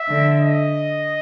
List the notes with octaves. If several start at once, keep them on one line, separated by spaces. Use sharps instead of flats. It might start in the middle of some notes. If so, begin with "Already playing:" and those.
Already playing: E5
D3
D#5